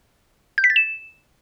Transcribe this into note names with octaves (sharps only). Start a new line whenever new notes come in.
G6
B6
A6
E7